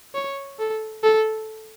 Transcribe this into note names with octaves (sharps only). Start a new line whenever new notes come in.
C#5
A4
A4